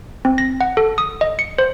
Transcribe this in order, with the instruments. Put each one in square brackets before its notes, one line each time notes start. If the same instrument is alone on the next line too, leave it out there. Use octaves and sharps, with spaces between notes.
[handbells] C4
A#6
F#5
A4
D#6
D#5
C#7
C5